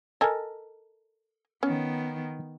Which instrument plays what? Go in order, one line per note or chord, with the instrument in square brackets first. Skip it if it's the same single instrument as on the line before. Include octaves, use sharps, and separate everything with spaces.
[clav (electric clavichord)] A4 A#4 [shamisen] D#5 G#5
[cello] D#3 B3 [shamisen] C#4